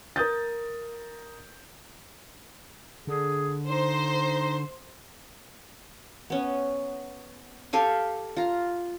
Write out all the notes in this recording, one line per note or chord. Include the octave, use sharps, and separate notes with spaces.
A#4 D#6 G6 A6
D3 G#4
D#4 C5
B3 C#4
G4 A4 F5 G#5
F4 A#5